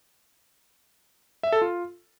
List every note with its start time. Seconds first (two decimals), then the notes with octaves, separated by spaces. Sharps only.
1.43 E5
1.52 A4
1.62 F4